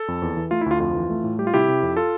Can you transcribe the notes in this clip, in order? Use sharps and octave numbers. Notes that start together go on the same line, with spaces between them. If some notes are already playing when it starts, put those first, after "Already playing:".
Already playing: A4
F2
E2
E3
A3 F4
E4
D2 F4
F2 F4
E3
A3
A2
G3 G4
F4
C3 E4 G4
C3
F2
F4 A4